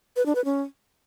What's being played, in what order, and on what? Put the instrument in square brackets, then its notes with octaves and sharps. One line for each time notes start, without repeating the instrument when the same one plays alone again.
[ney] B4
D4
B4
C#4